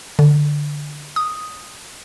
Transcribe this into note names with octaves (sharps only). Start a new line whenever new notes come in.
D3
D#6